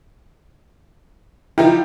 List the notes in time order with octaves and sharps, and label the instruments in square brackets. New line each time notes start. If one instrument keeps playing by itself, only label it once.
[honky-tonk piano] F3 D#4 G4 [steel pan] E4